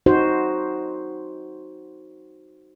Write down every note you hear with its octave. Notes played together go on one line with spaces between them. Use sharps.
D#4 F#4 C5